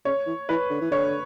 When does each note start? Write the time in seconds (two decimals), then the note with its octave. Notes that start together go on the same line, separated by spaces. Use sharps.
0.05 C#3 C#5
0.27 E3
0.49 E3 B4
0.70 D3
0.81 E3
0.91 D3 C#5